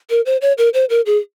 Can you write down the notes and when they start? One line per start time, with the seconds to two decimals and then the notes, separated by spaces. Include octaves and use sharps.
0.10 A#4
0.26 C5
0.42 C#5
0.58 A#4
0.74 C5
0.90 A#4
1.06 G#4